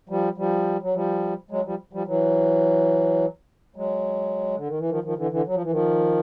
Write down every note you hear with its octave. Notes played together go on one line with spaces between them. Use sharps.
F3 G3
F3 G3
F#3
F3 G3
F#3 G#3
F3 G3
F3 G3
E3 F#3
F#3 G#3
D3
D#3
E3
D#3 F3
D#3 F3
D3 E3
D3 E3
F#3
F3
E3
D#3 F3